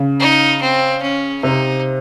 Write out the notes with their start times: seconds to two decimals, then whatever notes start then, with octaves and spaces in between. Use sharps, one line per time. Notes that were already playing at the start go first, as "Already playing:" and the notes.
Already playing: C#3
0.20 D#4
0.61 C4
1.02 C#4
1.43 C3 D#4